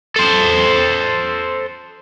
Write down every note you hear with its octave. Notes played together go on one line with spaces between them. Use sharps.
A4 C5